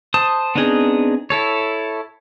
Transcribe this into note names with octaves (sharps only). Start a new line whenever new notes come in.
C5 A5 D#6
B3 C4 D4 D#4 G#4
E4 A4 C#5